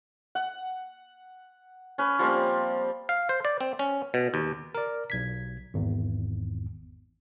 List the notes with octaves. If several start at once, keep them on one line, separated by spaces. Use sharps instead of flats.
F#5
C#4 B4
F3 G3 A#3 C4
F5
C5
D5
C4
C#4
B2
D#2
A#4 D5
B1 G#6 B6
G#1 E2